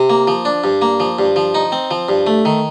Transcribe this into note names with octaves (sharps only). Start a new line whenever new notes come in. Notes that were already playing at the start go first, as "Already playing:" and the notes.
Already playing: C3
A#3
F3
D4
G2
A#3
F3
G2
F3
D#4
C4
F3
G2
A3
D#3